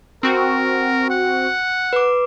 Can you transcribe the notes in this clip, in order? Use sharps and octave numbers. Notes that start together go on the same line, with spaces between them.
C4 F#4 A#4
F#5
B4 D6